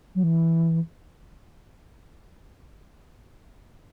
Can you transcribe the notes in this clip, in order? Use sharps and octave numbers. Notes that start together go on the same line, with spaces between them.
F#3
E3